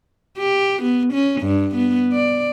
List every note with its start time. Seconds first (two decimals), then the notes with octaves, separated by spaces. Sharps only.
0.38 G4
0.82 B3
1.13 C#4
1.42 G2
1.75 B3
2.13 D5